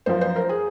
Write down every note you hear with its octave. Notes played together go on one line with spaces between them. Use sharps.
F#2 F3 C5
C5
A#4
G#4